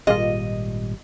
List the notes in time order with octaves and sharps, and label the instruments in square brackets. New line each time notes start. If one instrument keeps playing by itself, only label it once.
[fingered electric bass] G#1 G3 [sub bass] A#2 [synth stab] G#3 A#3 F4 [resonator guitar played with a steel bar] D#5